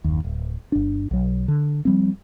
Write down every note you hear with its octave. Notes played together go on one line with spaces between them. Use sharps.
F#1 D#2
D1
G1 D4
B1 F#3
D3
F3 G3 C4